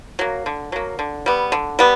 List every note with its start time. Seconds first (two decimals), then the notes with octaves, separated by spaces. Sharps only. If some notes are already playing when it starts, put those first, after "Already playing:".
0.19 F#3 A#3
0.46 D3
0.72 F#3 A#3
0.99 D3
1.26 G3 B3
1.52 D3
1.79 G3 B3